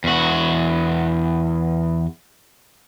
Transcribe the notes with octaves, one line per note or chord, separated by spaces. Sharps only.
E2 F#4